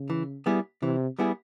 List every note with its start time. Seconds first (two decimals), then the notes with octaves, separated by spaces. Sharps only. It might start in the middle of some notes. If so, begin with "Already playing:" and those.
Already playing: C#3
0.10 E3
0.46 G3 B3 E4 G#4
0.82 C3 E3
1.19 G3 B3 E4 G#4